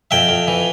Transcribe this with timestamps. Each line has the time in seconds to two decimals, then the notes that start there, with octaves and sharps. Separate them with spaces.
0.11 F2 E5 G5
0.29 F2
0.48 E3